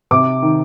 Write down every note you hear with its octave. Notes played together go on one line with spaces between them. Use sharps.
C3 D6
D#3